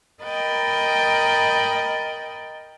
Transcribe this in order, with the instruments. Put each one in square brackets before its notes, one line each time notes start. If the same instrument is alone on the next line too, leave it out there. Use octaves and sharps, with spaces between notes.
[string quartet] A#4 D#5 G5 B5 A6